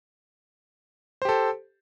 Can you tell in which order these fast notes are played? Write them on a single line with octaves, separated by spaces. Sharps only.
C5 G4 A4